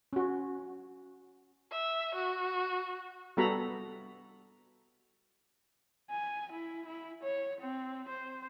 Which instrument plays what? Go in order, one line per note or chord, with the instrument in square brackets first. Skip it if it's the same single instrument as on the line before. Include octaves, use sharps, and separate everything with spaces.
[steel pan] C#4 F#4
[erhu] E5
F#4
[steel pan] G3 B3 F#4 A4 A#5 B5
[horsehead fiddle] G#5
E4
E4
C#5
C4
C5